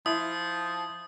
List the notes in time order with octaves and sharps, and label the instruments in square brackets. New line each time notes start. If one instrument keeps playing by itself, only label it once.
[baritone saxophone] F3 [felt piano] E4 [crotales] D#6